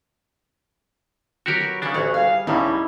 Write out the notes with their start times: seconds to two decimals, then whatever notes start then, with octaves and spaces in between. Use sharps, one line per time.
1.46 F#3 F#4 G4 A#4 C#6
1.60 B4
1.82 C#3 D4 G#4 B5 C#6
1.94 A1 D2 F#4 F#5 A#5
2.14 G3 G#4 F5
2.47 C#2 A2 C#3 G3 C#4 D#4 E4